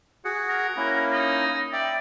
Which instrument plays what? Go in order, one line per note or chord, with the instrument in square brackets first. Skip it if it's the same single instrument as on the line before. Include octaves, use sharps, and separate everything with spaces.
[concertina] F#4 G#4 F#5
[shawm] A#4
[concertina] A#3 C#4 E4
[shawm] D#4
[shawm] D5 [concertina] E5 G5